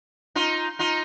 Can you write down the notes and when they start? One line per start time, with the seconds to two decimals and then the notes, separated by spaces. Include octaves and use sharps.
0.35 D#4 F4
0.79 D#4 F4